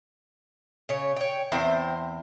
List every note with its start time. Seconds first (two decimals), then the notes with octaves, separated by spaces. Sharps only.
0.89 C#3 C#5
1.16 C#5 G5
1.52 E2 C4 C5 E5